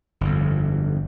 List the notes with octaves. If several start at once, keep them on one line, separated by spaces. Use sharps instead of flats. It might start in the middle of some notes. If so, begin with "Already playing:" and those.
G1 F2